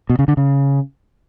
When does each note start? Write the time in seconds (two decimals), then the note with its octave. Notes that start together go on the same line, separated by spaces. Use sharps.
0.10 B2
0.19 C#3
0.28 D3
0.37 C#3